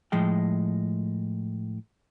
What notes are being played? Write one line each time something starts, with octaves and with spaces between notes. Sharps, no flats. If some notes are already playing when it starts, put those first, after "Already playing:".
A2 F3 G#3 G5